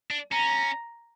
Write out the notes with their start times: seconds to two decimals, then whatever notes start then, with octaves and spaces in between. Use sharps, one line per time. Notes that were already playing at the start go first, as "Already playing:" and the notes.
0.11 D4
0.32 C#4 A#5